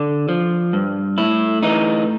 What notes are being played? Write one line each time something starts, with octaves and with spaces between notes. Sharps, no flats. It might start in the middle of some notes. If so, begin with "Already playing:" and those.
Already playing: D3 D4
F3
G2
A2 E4
E3 D#4